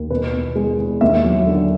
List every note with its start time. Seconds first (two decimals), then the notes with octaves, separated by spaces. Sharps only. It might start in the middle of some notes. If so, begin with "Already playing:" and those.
Already playing: D#2
0.10 B2 B4
0.33 E2
0.55 G#3
0.78 E2
1.01 D#2 E5
1.24 F#3
1.47 D3